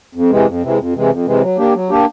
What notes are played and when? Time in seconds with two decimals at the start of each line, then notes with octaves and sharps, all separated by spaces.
0.15 F2
0.30 C3 E3 G#3
0.46 F2
0.62 C3 E3 G#3
0.78 F2
0.95 C3 E3 G#3
1.10 F2
1.26 C3 E3 G#3
1.42 F#3
1.58 A#3 D4 G4
1.74 F#3
1.90 A#3 D4 G4